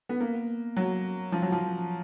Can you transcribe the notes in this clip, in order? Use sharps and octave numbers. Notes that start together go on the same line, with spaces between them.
B3
A#3
F#3
F3
F#3
F3